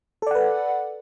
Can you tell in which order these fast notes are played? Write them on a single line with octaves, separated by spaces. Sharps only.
A4 D5 F#5 B4